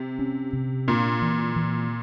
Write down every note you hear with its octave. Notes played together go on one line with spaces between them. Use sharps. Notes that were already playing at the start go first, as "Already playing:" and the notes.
Already playing: C3
C#4
C3
A#2 D4
E3
E3